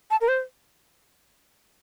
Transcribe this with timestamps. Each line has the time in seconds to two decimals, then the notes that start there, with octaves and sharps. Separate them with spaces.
0.11 A5
0.21 A#4
0.28 C5